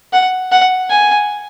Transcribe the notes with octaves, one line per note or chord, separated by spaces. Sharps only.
F#5
F#5
G#5